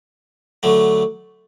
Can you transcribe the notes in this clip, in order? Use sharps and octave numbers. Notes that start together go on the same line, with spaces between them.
D3 F#3 A3